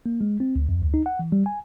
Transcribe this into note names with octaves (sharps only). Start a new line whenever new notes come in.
A#3
G#3
C4
D2
F2
D2
D#4
F#5
E3
G3
G#5